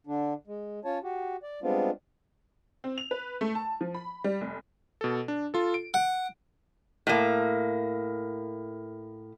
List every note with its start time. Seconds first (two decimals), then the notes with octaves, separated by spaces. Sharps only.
0.07 D3 D4
0.47 G#3
0.85 C#4 F4 C#5 A5
1.03 F#4 G4
1.43 D5
1.63 G3 G#3 B3 C4 D4 F4
2.84 C4
2.98 F7
3.11 B4
3.41 A3
3.55 A5
3.81 F3
3.94 B5
4.24 G3
4.41 F1
5.01 B2 A4
5.28 D4
5.54 F4 A4
5.74 D7
5.94 F#5
7.07 A2 A#3